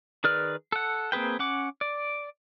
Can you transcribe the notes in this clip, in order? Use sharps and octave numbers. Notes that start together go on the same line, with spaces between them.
D#3 G#4 B4 D5 F6
A4 F#5
A#3 C4 G#4 B4 G5
C#4 F#5 D6
D5